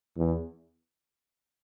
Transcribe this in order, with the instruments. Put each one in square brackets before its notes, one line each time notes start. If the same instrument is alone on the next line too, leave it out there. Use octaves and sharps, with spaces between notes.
[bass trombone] E2